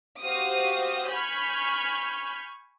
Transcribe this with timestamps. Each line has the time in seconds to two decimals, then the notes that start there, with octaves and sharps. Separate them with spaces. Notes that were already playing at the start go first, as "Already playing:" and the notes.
0.21 F#4 G4 C5 F5 D#6
1.09 G#5 B5 C#6 F6 G6